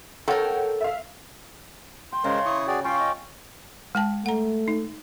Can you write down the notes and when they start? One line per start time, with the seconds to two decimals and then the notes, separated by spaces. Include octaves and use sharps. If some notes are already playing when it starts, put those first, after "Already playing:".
0.28 A4 A#4 C#5 F#5 G5
0.81 E5 F5
2.12 G5 C6
2.24 C#3 G#3 A#4 C5
2.46 E4 C#6 D#6
2.67 F#4 G#4 D5 G5
2.84 C#4 F4 F5 G5 C#6 D6
2.99 D#5
3.95 G#3 G5 A5
4.26 A3 F#5 A#5
4.68 D#4